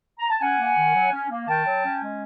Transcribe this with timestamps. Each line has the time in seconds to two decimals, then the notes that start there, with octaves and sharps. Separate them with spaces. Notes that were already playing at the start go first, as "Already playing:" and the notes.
0.19 A#5
0.29 A5
0.40 C#4 F#5 G#5
0.58 A#3
0.77 D#3
0.94 F#3
1.12 C#4
1.29 A#3
1.48 D#3 G5 A5
1.65 F#3
1.84 C#4
2.01 G#3